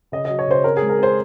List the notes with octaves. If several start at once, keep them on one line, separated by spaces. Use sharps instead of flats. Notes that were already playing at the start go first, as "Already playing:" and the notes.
C#3 D#5
F#3 D#5
C#5
C#3 C5
C4 A#4
G#4
G#3
A#4
C4 C5